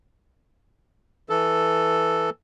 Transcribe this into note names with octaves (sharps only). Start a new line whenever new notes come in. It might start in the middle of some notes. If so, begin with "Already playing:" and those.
E3 A4